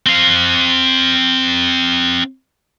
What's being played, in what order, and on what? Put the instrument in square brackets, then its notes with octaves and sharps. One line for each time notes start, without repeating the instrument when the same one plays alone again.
[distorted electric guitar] C4 F5